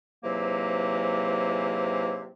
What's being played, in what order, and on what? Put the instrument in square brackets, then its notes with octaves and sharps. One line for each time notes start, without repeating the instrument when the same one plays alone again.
[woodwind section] G#2 C3 E3 F#3 A#3